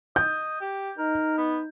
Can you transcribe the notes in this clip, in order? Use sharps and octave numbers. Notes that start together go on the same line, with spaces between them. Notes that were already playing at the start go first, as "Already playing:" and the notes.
D#5 G6
G4
D#4 A#4
B3